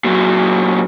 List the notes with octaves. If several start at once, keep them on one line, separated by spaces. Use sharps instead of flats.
A#2 F#3